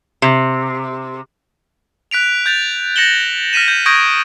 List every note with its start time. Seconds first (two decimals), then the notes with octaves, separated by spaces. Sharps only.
0.22 C3
2.11 F#6 B6 D7 F7
2.46 G6 A6 F7
2.96 A6 A#6 C#7 E7 F#7 G7
3.53 F6 A#6 B6 D#7 E7
3.68 G6
3.86 C#6 D#6 G6 G#6 A#6 D7